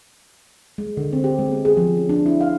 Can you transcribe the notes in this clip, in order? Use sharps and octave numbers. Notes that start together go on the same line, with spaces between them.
G#3
D3
C4
G4
G#3
B3
G#4
F3
C#4
D4
E4
F5